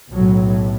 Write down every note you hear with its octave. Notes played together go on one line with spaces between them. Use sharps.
B1 A2 F#3